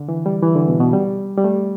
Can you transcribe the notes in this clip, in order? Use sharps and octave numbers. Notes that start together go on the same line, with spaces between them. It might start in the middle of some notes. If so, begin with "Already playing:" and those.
Already playing: D3
E3
G3
E3
D3
B2
B2
G3
G3
A3